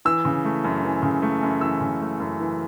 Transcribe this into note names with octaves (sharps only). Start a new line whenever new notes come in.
E3 E6
C#3
A3
F#2
E3
C#3
A3
F#2
E3 E6
C#3
A3
F#2
E3